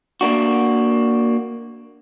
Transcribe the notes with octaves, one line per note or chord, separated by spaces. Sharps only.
A#3 D4 F#4